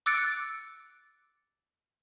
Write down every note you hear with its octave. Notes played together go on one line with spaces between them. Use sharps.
D6 E6 F#6 A6 C#7 D7